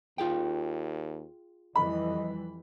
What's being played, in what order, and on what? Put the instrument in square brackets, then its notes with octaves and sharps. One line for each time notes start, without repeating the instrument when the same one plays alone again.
[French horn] D#2 [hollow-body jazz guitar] F4 G#4 G5
[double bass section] F2 E3 G3 [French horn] D#5 [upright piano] B5